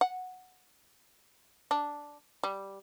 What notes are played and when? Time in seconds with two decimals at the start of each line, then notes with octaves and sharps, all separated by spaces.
0.01 F#5
1.71 D4
2.43 G3